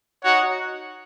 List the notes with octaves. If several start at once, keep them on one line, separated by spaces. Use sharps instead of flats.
D#4 F#4 C#5 F#5